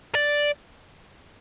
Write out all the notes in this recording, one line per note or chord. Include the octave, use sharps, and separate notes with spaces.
D5